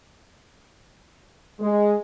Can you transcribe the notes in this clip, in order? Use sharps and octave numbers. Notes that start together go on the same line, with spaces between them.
G#3